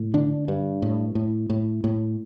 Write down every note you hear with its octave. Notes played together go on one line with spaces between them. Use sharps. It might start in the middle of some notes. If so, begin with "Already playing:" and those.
Already playing: A2
D3 D4
G2
A2
A2
A2
A2